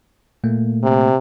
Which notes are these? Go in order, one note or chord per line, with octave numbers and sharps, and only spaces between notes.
A#2 A3 A#3
C3